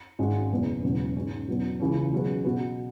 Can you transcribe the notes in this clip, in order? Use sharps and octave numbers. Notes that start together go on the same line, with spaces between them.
G#1 G#2 G#3 C#4 F#4
F#1 E2 B2 G#3
E1 E2 C#3 F#3 C#4
G#2 G#3 C#4
E2 B2 F#3
C#2 C#3 E3 C#4
B2 F#3 C#4 G#4 B4
B2 B3 F#4 B4